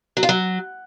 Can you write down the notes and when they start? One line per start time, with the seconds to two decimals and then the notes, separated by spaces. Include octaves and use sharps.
0.17 F#3
0.23 F4
0.29 F#3